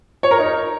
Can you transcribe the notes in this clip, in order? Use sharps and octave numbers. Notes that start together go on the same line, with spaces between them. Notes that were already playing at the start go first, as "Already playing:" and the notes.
C#5
A#4
D#4